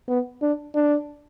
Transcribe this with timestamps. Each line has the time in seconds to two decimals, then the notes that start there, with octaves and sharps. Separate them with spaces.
0.08 B3
0.42 D4
0.75 D4